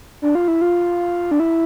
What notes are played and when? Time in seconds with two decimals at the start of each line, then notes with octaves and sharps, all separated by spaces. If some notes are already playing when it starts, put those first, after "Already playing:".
0.22 D4
0.35 F4
0.48 E4
0.61 F4
1.31 D4
1.40 E4